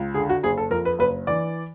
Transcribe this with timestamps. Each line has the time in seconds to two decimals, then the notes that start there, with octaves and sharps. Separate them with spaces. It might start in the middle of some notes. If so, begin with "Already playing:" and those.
Already playing: C#2
0.14 D3 G#4
0.29 F#4
0.43 F#1 G#4
0.58 A4
0.71 F2 A#4
0.85 B4
0.99 F#1 B4
1.27 E3 D5